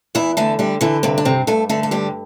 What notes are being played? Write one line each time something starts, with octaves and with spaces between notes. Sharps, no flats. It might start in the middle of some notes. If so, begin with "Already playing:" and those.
E2 E3 E4
D3 A3 A4
D3 G3 G4
D3 E3 E4
G2 C3 C4
D4
G2 C3 C4
G2 A3 A4
D3 A3 A4
A4
G2 G3 G4